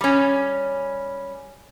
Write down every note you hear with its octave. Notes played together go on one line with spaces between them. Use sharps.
G3 C#4